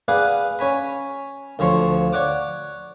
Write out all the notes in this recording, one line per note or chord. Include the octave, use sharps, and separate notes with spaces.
G#4 B4 D5 F5 F#5 G#5
C#4 C#5 G#5 B5
D2 F3 C#5 C6 C#6
C#5 D5 F#5 D6